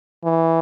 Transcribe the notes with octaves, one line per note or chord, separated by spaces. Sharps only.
E3